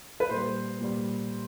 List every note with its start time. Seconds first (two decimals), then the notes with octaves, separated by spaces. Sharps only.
0.20 B4
0.30 A#2 G3 C5
0.81 A#2 G3